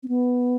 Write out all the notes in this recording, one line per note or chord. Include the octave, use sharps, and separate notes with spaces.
C4
B3